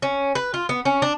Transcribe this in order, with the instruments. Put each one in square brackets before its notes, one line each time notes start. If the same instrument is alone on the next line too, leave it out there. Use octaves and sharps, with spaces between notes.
[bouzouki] C#4
B4
F4
B3
C#4
D4